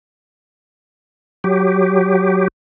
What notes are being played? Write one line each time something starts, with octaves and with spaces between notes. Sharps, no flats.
F#3 G4